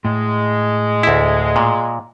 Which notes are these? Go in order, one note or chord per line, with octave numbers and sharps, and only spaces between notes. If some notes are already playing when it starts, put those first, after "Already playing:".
A2 G#3
D2 E4
A#2